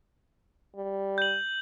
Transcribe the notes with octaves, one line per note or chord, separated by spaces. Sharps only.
G3
G6 F#7